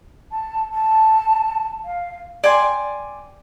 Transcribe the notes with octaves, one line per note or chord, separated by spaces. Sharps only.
A5
A5
F5
D5 G5 G#5 C6